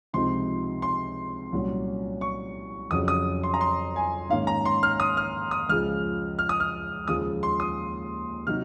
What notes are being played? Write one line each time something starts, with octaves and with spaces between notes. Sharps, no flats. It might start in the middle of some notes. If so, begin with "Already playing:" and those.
C#2 C3 F3 C4 D#4 C6
C6
C2 A#2 F#3 C#4
C#6
F2 C#3 F#3 C#4 D#6
D#6
C6
A#5
C6
G#5
G#2 D#3 A#3 C#4 F5
A#5
C6
F6
D#6
F6
D#6
C#2 C#3 F3 F6
F6
D#6
F6
D#2 C#3 F3 G#3 D#6
C6
D#6
C3 F#3 A#3 D#4 F6